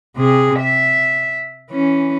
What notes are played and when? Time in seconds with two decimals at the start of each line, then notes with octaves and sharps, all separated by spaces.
0.17 C3 G#4
0.59 E5
1.71 E3 C#4